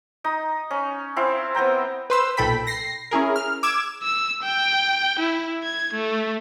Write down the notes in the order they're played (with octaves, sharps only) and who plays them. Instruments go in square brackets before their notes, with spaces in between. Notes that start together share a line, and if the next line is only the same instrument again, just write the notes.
[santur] D#4 D#6
C#4
C4 E4 F5
B3 C4 G5 A#5
[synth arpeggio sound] B4 C5 E6
B1 A#2 A4 G5 B5 B6
A#6 C7
C#4 E4 G#4 A#4
F6
D6 E6 G#6 E7
[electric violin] E6
G5
E4
G#6
A3